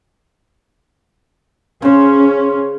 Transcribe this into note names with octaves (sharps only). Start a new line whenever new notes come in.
C#3 C#4 C5